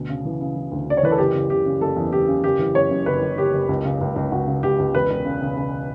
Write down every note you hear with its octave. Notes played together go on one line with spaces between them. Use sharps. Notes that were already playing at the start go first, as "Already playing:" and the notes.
Already playing: D2 B2
C#3
E3
C#3
E3
D2
C#3 D5
C#5
E3 B4
A4
F#1 G4
C#3
F#1 G4
C#3
F#1 A4
E2
F#1 G4
C#3
F#1 G4
E3
F#1 C#5
F#2
F#1 B4
F#1
F#1 G4
F#1
C#2
C#3
C#2
C#2
C#2 F#4
C#3
C#2 G4
C#2
E1 B4
E1
C#3
C#3
C#3